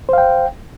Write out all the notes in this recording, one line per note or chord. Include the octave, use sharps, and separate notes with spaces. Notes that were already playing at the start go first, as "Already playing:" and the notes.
C5 F5 G5